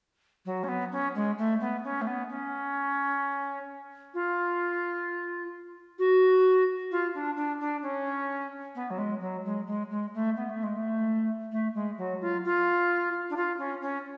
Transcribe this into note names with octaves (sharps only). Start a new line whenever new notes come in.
F#3
C#4
B3
C#4
G#3
A3
B3
C#4
A3
B3
C#4
F4
F#4
F4
D4
D4
D4
C#4
B3
F#3
G#3
F#3
G#3
G#3
G#3
A3
B3
A3
G#3
A3
A3
G#3
F#3
F4
F4
D4
F4
C#4
C#4